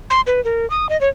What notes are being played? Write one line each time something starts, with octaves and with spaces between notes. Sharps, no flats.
C6
B4
A#4
D#6
D#5
C#5